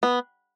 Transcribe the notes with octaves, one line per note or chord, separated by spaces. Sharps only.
B3